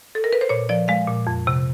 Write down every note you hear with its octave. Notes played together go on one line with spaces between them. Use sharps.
A4
A#4
B4
C5
A#2 C#5
F3 D5
G#3 F5
A#2
F2
C3